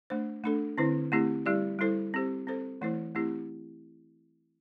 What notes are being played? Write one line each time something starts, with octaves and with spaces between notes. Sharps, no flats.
A3 D4 C5
A3 D4 A4
D3 C4 E4 C5
A3 C4 E4 G4
G3 E4 G4 D5
G3 E4 A4 C5
C4 G4 C5
C4 A4 C5
E3 A3 E4 C5
A3 C4 E4 G4